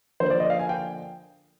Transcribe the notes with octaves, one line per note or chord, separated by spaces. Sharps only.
D3 F3 A#3 D4 C5
D5
D#5
F5
G#5
G5